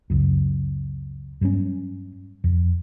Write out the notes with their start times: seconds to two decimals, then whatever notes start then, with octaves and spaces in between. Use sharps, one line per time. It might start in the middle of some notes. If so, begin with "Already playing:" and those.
0.10 C#2 F#2
1.41 G2 F#3 B3 C#4
2.44 F2